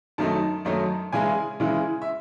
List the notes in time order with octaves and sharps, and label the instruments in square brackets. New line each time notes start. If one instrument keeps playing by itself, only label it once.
[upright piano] F#2 D#3 F#3 A3 D#4 A5
F#2 D#3 F#3 A3 D#4
C#3 E3 G#3 C#4 E4 G#5
C#3 E3 G#3 C#4 E4
E5